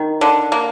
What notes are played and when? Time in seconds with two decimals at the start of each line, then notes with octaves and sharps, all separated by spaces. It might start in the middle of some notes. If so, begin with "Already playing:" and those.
Already playing: D#3
0.21 D3
0.52 A#3